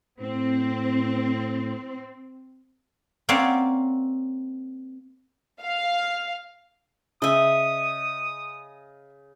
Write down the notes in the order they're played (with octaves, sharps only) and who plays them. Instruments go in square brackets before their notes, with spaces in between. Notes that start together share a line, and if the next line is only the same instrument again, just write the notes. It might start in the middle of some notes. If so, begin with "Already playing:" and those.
[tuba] A2 [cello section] C4
[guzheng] A#3 C4 C#4 D5 F5 F#5
[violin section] F5
[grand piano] C#3 [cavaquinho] D#5 E5 [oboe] D#6